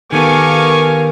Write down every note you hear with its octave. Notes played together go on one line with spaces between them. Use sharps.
D#3 B3 G4 A4 A#4 F5 G#5 C#6